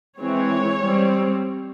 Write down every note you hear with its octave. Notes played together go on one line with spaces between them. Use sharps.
E3 G#3 C4 C#5
G3 C4